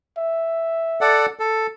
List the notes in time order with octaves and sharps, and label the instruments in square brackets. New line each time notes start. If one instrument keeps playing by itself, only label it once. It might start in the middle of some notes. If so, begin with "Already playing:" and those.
[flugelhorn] E5
[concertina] A4 D5 F#5
A4